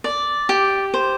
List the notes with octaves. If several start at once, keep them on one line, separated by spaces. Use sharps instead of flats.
D5
G4
C5